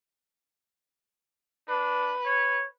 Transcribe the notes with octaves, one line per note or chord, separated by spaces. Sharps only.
D4 B4
C#5